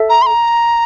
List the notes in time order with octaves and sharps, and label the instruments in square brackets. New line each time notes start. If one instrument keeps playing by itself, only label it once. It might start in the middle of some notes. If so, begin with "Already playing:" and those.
Already playing: [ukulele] A4 E5
[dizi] A#5
C6
A#5